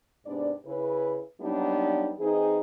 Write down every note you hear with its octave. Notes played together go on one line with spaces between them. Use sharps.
G#2 C3 B3 D4 D5
C#3 E4 B4
F#3 G3 A#3 B3 D4 D#4
E3 C4 D#4 G#4